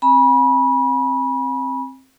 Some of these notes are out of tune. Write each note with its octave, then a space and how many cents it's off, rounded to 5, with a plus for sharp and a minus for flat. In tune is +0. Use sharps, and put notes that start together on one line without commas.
C4 +15 G#5 +0 B5 -30